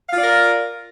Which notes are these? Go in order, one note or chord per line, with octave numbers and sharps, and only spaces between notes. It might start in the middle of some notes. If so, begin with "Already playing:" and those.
F4 A#4 D5 F5